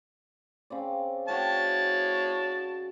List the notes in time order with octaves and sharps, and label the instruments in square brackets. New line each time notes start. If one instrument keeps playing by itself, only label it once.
[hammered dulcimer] C#3 C4 D5
[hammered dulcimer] F#4 G5 [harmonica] C#5 A5